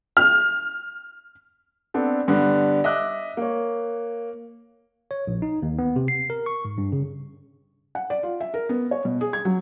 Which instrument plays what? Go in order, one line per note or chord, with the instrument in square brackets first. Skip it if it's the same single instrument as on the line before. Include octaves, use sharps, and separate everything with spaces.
[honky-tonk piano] F6
[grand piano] B3 C4 D4 A4
G2 D3 B3 D4
D#5 E5 D6 F#6
A#3 C#5
[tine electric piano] C#5
A#1
D#4
D#2
B3
C3
C7
A#4
C#6
G#2
G2
C#3
[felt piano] F#5
D5
F4
E5
A#4
B3
C#5
B2
G#4
G#6
F#3